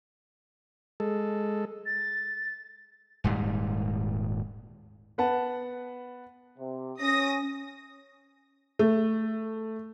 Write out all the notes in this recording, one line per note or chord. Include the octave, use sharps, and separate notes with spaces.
G#3 A4
A6
D#1 G#2 G3
B3 B4 F#5 A5
C3
C#4 D#6 A#6
A3